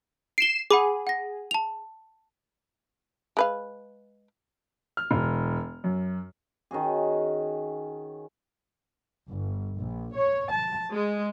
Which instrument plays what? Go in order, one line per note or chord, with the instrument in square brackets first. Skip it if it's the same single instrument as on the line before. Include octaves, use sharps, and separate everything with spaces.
[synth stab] C7 E7 [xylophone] D7 G7
[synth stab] G#4 [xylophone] F#5 B5 D6
[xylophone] F#5 A#6
A5 F7
[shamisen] G#3 B4 F5
[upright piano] F6
E1
F#2
[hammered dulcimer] D#3 C#4 F#4 G#4
[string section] G1
A#1
C#5
A5
G#3